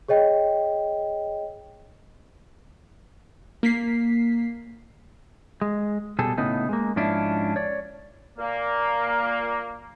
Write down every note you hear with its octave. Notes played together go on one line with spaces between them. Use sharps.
G#4 C#5 D#5 G5
A#3 B6 C7
G#3
B2 G3 G#4 A4
A2 C#3 B3 D#4
G#3 A#3
G#2 F3 C#4 D4 E4
C#5 D5
A#2 A#3